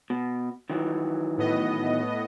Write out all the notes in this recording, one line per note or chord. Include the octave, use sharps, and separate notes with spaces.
B2
D#3 E3 F#3
A2 B3 D#5